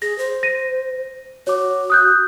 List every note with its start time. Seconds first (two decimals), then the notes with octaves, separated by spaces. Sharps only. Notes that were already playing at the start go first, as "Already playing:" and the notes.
0.02 G#4 A#6
0.18 C5
0.43 A#6 D#7
1.47 F#4 C#5 D6
1.90 D#6 F#6 G6